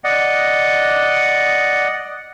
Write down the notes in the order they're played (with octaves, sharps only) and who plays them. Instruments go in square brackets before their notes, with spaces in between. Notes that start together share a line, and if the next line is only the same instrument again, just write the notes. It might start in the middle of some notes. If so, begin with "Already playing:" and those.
[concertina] D5 D#5 F#5